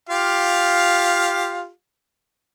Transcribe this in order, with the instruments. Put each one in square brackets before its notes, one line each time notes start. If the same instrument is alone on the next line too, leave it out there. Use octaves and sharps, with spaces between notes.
[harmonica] F4 G4 F5